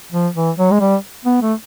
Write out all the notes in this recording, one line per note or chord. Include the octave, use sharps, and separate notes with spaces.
F3
E3
F#3
G#3
G3
B3
A3